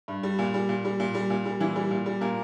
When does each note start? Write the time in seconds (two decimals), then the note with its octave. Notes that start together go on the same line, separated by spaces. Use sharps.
0.08 G2
0.23 G3
0.39 A#2
0.54 G3
0.69 A#2
0.85 G3
1.00 A#2
1.15 G3
1.30 A#2
1.45 G3
1.60 A#2 E3 E4
1.76 G3
1.91 A#2
2.06 G3
2.21 A#2 A#3 A#4